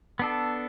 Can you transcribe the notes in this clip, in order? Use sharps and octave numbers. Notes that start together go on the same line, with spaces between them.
B3 D4 A4